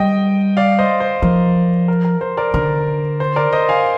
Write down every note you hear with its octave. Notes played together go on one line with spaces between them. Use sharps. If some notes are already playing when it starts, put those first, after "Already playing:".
Already playing: G3 D#5 G5
D5 F5
C5 D#5
C5
F3 A#4
A#4
A#4
C5
A#4 D5
D3 A#4
C5
A#4 D5
C5 D#5
F5 G#5